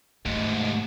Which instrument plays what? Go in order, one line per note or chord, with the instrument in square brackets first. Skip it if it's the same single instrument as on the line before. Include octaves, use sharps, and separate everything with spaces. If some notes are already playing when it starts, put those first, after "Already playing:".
[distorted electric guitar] D#2 G#2 [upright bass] A3